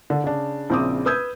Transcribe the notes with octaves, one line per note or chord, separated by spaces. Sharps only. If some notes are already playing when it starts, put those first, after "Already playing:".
D3
C#3 D4
A#1 C#3 C4 E4 D6 D#6
B4 D#6 E6 G6 G#6